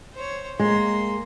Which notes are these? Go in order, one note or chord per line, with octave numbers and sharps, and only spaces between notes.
C5 C#5
G#3 A#3 C6